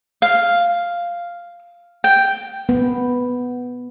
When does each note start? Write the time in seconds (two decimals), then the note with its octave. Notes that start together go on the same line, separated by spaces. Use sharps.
0.22 F5
2.04 G5
2.69 B3